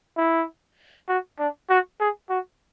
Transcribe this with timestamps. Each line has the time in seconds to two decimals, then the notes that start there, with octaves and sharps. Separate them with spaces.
0.17 E4
1.09 F#4
1.39 D4
1.70 F#4
2.00 G#4
2.30 F#4